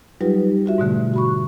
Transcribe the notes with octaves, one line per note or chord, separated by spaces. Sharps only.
F#3 G3 D#4 F4 G4 B4
F4 F#4 E5
G#2 B2 D3 A3
F#4 B5 C#6